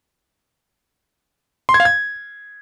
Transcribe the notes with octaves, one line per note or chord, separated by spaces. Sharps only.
C6
G#6
F5
G#6